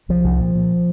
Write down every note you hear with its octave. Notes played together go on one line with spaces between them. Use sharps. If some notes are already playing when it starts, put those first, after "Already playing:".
C2 F3
C2
A#2
A#2